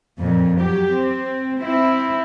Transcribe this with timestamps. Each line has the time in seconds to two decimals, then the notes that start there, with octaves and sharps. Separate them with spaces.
0.20 F2 A#2
0.59 F#3 G4
0.92 C4
1.59 C4 E4